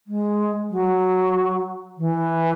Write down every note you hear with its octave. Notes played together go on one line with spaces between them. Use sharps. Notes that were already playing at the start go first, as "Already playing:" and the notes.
G#3
F#3
E3